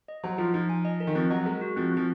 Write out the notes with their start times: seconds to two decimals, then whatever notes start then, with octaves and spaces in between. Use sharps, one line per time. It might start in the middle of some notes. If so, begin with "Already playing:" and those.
0.08 D#5
0.23 F#3 C5
0.38 F3 F4
0.54 F3 D#4
0.69 G#5
0.85 D#5
1.00 A#4
1.07 D#3
1.15 F3 C4
1.30 F#3 D#5
1.45 G#3 A#4
1.61 F#4
1.76 F3 C4
1.92 C4
1.97 F3